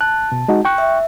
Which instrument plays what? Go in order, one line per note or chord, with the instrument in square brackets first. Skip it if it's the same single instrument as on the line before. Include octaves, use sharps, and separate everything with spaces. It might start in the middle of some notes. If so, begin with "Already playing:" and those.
[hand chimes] A5 [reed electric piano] F#6
[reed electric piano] B2
G#3 D#4 F#4
G5 C#6 F#6
[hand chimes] E5